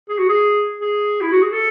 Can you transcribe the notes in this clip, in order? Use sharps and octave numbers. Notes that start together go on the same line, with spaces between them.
G#4
F#4
G#4
G#4
E4
F#4
G#4
A4